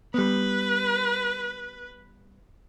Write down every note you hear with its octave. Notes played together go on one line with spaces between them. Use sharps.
G3 B3 B4